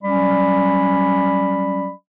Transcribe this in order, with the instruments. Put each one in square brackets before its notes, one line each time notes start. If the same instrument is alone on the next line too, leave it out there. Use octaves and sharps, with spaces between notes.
[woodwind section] F#3 G3 C#4 D5 B5